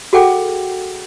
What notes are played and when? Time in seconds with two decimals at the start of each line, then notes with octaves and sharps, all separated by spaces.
0.13 F#4 G#4 A4 F#5 G5 D6